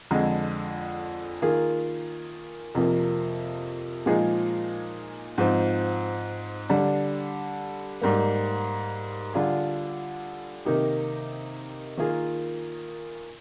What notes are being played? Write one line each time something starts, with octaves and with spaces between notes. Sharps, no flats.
F2 D3 G#3
D#3 A#3 F4 G#4
F2 C3 F3 A#3
A#2 F3 G#3 D#4 G#4
G#2 F3 C4
D3 G3 D4
G#2 G3 A#3
D3 G3 D4 F4 G#4
C3 D#3 A#3 D#4 G4
D#3 A#3 F4 G#4